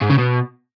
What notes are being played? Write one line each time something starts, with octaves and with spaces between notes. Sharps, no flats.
G#2
C#3
B2